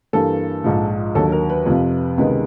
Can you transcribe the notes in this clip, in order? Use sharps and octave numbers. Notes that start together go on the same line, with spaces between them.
G2 E3 G3 A#3 A4
A#1 G#2 F3
D#2 D3 F#3 A4
A#4
B4
F2 C3 F3
C#2 C3 D#3 G#3 B3